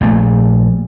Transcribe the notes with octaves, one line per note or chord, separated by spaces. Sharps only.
A#1 A#2 A3